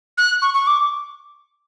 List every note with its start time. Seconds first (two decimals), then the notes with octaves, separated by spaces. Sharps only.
0.18 F#6
0.42 C#6
0.54 C#6
0.67 D6